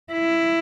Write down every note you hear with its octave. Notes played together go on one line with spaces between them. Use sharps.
E4